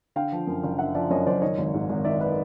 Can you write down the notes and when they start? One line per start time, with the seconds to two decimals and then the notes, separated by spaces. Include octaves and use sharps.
0.16 D3 F5 G5
0.32 F3
0.47 F#2
0.63 F#1
0.79 D3 E5 F#5
0.95 F3 D5 E5
1.10 F#2 C#5 D#5
1.26 F#1 C5 D5
1.42 D#3 C#5 D#5
1.58 G#1
1.74 G#2
1.90 G#1
2.05 D#3 D5 E5
2.21 B4